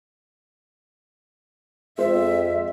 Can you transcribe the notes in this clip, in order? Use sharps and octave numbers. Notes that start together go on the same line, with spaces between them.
F2 G#3 F4 C5 E5